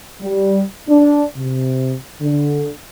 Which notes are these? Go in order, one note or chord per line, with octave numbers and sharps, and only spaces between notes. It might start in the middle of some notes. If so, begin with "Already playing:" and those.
G3
D4
C3
D3